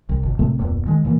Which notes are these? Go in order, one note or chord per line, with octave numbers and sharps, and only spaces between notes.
C2
G1 B2
A2 C3 A3 C4
D1 F2 A#2 B3
D#3 G#3
A#2 E3 G#3 A#3